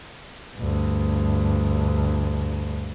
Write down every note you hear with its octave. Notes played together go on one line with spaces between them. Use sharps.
D2 G2